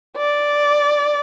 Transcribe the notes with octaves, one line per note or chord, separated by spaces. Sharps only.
D5